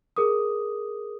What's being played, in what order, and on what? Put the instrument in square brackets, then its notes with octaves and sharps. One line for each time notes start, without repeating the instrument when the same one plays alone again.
[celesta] G#4 A#4 D6 D#6